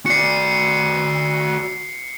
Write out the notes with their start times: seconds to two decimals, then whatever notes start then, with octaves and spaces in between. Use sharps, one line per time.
0.06 F#4 D5 C7 C#7